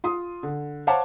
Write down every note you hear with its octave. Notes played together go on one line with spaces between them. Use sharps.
F4 C6 D#6
D3
C5 C#5 F5 F#5 A5 D6